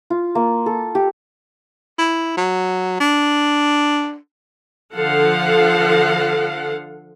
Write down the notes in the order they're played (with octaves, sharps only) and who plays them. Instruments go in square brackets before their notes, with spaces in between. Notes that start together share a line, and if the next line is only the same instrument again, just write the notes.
[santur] F4
A#3
A4
G4
[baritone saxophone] E4
F#3
D4
[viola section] D3 F3 A4 F5 F#5